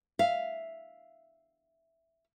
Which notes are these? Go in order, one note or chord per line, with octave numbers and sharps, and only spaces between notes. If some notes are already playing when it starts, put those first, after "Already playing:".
E5 F5